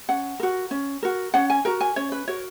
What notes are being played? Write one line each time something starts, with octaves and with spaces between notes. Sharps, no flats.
C#4 F#5
F#4 A#4
C#4
F#4 A#4
C#4 F#5
G#5
F#4 A#4 A#5
G#5
C#4 C#5
B4
F#4 A#4 C#5